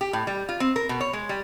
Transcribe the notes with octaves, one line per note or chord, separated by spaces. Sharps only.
G4
A2
G3
F4
C4
A#4
B2
C#5
G#3
G3